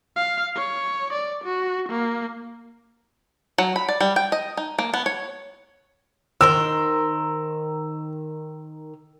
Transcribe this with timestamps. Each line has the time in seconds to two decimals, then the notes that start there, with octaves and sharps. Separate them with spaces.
0.16 F5
0.56 C#5
1.13 D5
1.44 F#4
1.89 A#3
3.58 F#3
3.76 B5
3.89 D5
4.01 G3
4.16 G5
4.32 D#5
4.57 D#4
4.79 A#3
4.94 B3
5.06 C#5
6.41 D#3 A#4 C5 E6